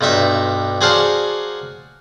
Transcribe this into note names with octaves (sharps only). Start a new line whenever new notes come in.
B1 G2 D#4 E5
F#3 G#4 C5 D5 F5 A5